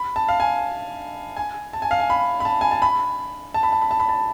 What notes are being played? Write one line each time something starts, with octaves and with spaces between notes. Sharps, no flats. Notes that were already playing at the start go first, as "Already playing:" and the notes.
Already playing: B5
A5
F5
G#5
G#5
A5
G#5
F5
G#5
B5
B5
A5
G#5
A5
B5
A5
B5
A5
B5
A5
B5
A5